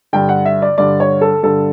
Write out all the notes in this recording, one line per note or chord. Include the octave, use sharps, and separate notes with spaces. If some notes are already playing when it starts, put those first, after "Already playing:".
G2 D3 G5
F#5
E5
D5
G2 D3 D5
C#5
A4
G2 D3 A4